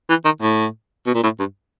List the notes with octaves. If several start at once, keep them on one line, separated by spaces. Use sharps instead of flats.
E3
D#3
A2
B2
A#2
A2
G2